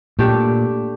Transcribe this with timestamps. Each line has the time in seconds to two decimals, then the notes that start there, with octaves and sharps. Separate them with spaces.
0.19 A#2 A3 D4 G4